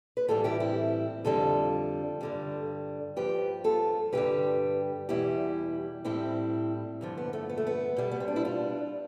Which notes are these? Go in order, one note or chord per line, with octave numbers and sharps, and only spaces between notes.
B4
A2 E3 G3 F4 A4
E4 G4
C4 E4
F2 D3 G3 F4 A4
G2 D3 G3
G2 F3 G4 B4
F4 A4
G2 D3 G3 G4 B4
E2 B2 G3 E4 G4
A2 G3 C4 E4
G2 D3 F3
B3
A3
B3
A3
B3
B2 G3
B3
C4
D4
E4
D4 F4